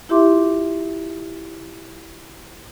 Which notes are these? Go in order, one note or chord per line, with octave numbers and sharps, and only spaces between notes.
E4 F4 G4 E5 C6 D6